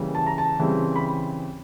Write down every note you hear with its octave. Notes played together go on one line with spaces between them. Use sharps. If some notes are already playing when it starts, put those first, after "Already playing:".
Already playing: C#3 E3 G3 A#3
A5
A#5
A5
C#3 E3 G3 C4
B5